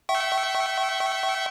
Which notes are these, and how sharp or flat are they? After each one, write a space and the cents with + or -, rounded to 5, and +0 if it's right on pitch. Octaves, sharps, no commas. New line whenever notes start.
E5 +0 G5 -40 C#6 -20